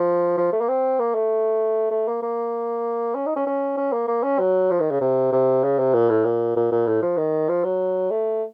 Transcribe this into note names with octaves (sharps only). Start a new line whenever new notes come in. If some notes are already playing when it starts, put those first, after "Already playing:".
Already playing: F3
F3
A3
A#3
C4
A#3
A3
A3
A#3
A#3
C#4
D#4
C#4
C#4
C#4
A#3
A#3
C#4
F#3
F3
D#3
C#3
C3
C3
C#3
C3
A#2
A2
A#2
A#2
A#2
A2
F3
D#3
F3
F#3
A3